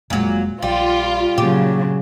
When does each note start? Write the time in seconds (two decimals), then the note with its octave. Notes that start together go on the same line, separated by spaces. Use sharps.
0.10 F1 A#2 F#3 G#3
0.63 A#1 G3 F4
1.38 A#2 C#3 F#3 A#3 G4